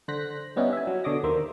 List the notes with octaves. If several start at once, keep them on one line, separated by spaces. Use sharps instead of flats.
D3 C5 F#6 A#6 B6
G3 B3 C#4 D#4 E4 G4
E5 G#5
F#3
B2 D3 C#5 D#5 D6 A#6
D#2 A#3 C5 E5